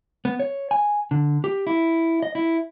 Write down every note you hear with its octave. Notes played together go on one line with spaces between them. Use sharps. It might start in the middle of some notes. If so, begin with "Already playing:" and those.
B3
C#5
G#5
D3
G4
E4
D#5
E4